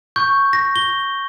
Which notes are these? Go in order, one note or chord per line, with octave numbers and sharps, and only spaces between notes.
C#6 G6
A#6
G7